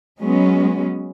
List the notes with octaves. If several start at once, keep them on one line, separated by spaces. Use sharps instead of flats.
F#3 G#3 B3 C#4